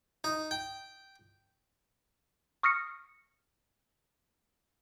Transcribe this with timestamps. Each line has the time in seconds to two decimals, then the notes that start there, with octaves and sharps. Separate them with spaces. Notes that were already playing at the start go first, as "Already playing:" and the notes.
0.24 D#4
0.51 G5
2.63 C#6 D#6 F6 A#6 C7 C#7